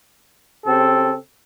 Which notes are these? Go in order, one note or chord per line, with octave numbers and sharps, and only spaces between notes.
C#3 C4 G4 A4